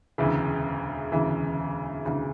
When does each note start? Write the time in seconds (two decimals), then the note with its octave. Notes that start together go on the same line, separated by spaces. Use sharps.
0.18 E1 D2 C#3 E3
1.12 E1 D2 C#3 E3
2.05 E1 D2 C#3 E3